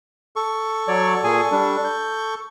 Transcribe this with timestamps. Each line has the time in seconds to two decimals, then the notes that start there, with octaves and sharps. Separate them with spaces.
0.36 A4 C#6
0.88 F#3 C#5 D5
1.24 A#2 G#4 G#5
1.52 G3 D4
1.85 G6